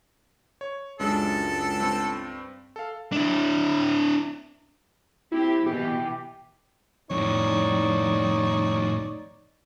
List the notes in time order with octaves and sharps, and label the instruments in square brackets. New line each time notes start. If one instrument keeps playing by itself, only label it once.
[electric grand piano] C#5
[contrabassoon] C#2 [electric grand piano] F#2 G#3 D4 [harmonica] A4
[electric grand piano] G2 C4
A4 F5
[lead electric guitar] D4 E4
[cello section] C4 G4 [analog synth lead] E4
[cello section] B2 E3 [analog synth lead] G4
[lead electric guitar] F2 A2 [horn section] D#4 C#5 D5